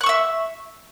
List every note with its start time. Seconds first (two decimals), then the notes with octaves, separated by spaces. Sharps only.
0.01 F#6
0.03 C#6
0.06 E6
0.09 E5